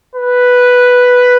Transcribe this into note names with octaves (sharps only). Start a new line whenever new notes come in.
B4